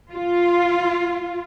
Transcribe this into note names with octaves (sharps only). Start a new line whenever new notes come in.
F4